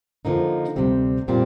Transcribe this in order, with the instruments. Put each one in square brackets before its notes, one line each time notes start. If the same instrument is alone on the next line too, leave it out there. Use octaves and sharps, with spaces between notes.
[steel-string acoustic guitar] D3 F3 A#3 D#4
D2 C3 G3 C4
A#2 G3 C4 F4